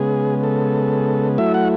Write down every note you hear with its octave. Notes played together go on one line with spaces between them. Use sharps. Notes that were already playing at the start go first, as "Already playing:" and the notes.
Already playing: C#3 G#3 B3 G#4
A4
F#3 A3 E4 E5
F#5